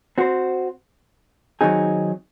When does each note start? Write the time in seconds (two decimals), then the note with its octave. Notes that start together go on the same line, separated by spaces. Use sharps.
0.18 C4 F#4 C5
1.61 D#3 F#3 C4 D#4 G#4